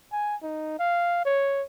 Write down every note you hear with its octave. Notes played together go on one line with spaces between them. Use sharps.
G#5
D#4
F5
C#5